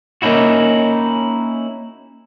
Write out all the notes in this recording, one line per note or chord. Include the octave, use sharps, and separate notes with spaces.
A#3 C#4 D#4 E4 F#4